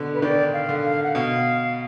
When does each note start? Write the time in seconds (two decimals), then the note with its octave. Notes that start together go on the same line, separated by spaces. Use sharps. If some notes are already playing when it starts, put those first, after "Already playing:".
Already playing: B2 D3
0.14 B4
0.22 D#3 D5
0.53 F5
0.69 D3
0.84 F5
1.03 F#5
1.15 B2 F5